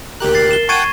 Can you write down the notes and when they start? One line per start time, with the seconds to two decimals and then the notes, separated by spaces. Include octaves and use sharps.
0.20 D2 G4 A#4 F#6
0.35 A6 C7
0.51 E7 G7
0.69 F#5 G5 A5 C#6 G#6 D#7